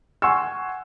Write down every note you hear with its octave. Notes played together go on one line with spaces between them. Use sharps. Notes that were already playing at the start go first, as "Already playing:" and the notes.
F#5 G#5 C6 C#6 E6